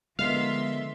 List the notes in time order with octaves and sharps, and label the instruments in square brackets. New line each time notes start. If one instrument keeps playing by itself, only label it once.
[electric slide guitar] D3 B3 A#4 [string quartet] F3 E5 C6 [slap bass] G#3 [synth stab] F5